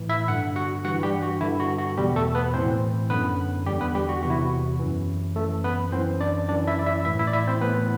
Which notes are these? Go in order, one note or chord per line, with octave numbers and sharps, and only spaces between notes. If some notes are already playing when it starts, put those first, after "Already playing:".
Already playing: A2 E3
E4 E5
G2 D3 F#5
F#4 F#5
G2 E3 F#4 F#5
G3 G4
F#4
G2 D3 E4
F#4
F#4
E2 B2 G3 G4
A3 A4
B3 B4
A2 E3 C4 C5
F#2 D3 B3 B4
E2 D3 G3 G4
B3 B4
G3 G4
F#4
E2 C3 E3 F#4
E4
F#4
F#2 E3
F#2 E3 A3 A4
B3 B4
F#2 E3 C4 C5
D4 D5
F#2 D4 D5
E3
E4 E5
D5
E4 E5
A2 E3 E4 E5
E4 E5
D5
E4 E5
C4 C5
A2 E3 B3 B4